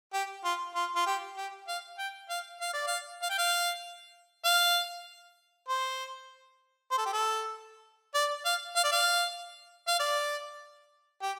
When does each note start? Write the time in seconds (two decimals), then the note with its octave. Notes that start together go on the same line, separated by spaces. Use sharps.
0.13 G4
0.44 F4
0.75 F4
0.95 F4
1.06 G4
1.37 G4
1.68 F5
1.99 G5
2.30 F5
2.60 F5
2.74 D5
2.87 F5
3.22 F5
3.30 G5
3.38 F5
4.45 F5
5.68 C5
6.91 C5
6.98 A4
7.06 G4
7.13 A4
8.14 D5
8.45 F5
8.76 F5
8.84 D5
8.92 F5
9.88 F5
9.99 D5
11.22 G4